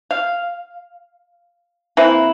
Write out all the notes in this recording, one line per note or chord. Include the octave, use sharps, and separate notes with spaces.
F5
E3 A#3 C4 E4